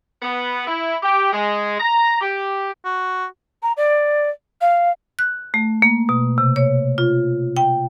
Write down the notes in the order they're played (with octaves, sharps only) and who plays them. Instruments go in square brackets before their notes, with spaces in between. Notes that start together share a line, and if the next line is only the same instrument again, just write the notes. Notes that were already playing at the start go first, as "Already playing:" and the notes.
[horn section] B3
E4
G4
G#3
A#5
G4
[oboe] F#4
[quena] A#5
D5
F5
[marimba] F#6
A3
A#3
B2
C3
C#5
F4
G5